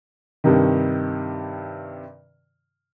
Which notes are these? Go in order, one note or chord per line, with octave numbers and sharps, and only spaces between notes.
G2 C3 D#3